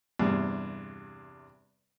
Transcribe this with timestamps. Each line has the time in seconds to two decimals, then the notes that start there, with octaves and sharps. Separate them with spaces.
0.19 E2 G2 C3